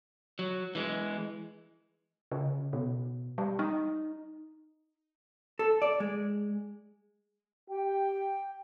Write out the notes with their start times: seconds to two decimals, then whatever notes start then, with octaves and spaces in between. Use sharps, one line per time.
0.39 F#3
0.75 E3 G#3
2.32 C#3
2.73 B2
3.38 G3
3.59 D#4
5.59 A4
5.82 D5
6.00 G#3
7.69 G4 G5